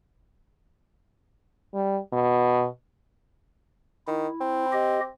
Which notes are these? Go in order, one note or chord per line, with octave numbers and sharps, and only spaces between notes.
G3
B2
D#3 E4
C4
G4 D#5